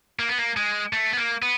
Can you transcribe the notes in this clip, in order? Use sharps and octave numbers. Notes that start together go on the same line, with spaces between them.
A#3
B3
A#3
G#3
A3
B3
A#3
B3